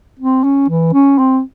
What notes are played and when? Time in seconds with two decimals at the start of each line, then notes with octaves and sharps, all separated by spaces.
0.19 C4
0.44 C#4
0.69 E3
0.93 C#4
1.18 C4